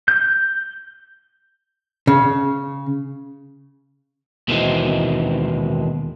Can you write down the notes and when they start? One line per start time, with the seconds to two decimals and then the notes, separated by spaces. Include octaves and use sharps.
0.08 G6
2.07 C#3
4.48 D#2 B2 D#3 E3 G#3 C4